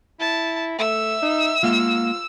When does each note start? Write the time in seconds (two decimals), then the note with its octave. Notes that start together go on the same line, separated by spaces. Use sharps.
0.20 E4 A5
0.79 A3 E5 E6
1.22 D#4
1.63 G#3 A#3 F4 F#5